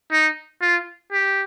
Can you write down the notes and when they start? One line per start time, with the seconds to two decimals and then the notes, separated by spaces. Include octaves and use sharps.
0.12 D#4
0.62 F4
1.13 G4